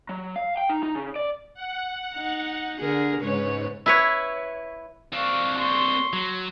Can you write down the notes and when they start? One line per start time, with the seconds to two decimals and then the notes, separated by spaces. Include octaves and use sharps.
0.09 F#3
0.36 F5
0.57 G5
0.69 D#4
0.83 D#4
0.95 C#3
1.16 D5
1.54 F#5
2.15 D#4
2.80 D3 G#4 A#4
3.20 G#2 C#3 B4 C#5
3.86 E4 B4 C#5
5.13 C4 D4 F5 C#6
5.57 C6 C#6
6.13 F#3